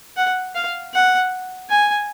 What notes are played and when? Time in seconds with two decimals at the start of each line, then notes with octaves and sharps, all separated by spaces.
0.17 F#5
0.55 F5
0.94 F#5
1.70 G#5